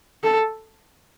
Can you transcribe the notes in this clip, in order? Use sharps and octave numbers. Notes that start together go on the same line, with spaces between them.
A4